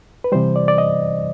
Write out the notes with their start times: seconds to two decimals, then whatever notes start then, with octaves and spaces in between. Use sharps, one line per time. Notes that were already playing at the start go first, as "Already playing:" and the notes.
0.24 B4
0.32 C3 E3 G3 C5
0.56 D5
0.68 D5
0.78 D#5